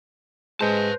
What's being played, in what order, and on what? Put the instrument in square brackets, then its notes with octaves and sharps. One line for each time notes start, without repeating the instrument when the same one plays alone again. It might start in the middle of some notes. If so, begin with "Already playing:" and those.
[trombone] G#3 [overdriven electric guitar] B4 A5 [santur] C5